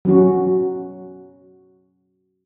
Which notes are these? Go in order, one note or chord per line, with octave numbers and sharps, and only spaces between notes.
F#3 C#4 F#4